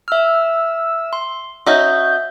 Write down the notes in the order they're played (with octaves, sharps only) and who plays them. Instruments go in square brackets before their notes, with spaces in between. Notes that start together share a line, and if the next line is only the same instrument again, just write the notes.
[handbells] E5 F6 [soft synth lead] E6
[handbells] C6
[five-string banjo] C#4 D#4 F#4 [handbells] E5 [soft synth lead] G6